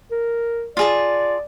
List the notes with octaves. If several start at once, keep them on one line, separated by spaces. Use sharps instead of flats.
A#4
F4 G#4 D5 A5